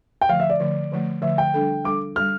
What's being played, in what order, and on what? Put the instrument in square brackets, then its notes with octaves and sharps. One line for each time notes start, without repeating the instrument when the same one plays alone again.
[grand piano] G5
[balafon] D3 F3 A3 [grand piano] F5
[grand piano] E5
D5
[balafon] D3 F3 A3
D3 F3 A3
[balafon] D3 F3 A3 [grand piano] E5
[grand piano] G5
[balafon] G3 D4 A4
[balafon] G3 D4 A4 [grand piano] D6
[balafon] G3 D4 A4 [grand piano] F6